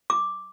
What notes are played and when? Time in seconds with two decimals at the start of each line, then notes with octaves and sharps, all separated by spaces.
0.10 D6